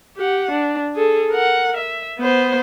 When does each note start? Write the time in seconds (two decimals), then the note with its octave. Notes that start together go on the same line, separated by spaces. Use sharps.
0.17 G4 F#5
0.51 D4
0.95 G#4 A4
1.30 A#4 F#5
1.77 E5
2.19 B3 C5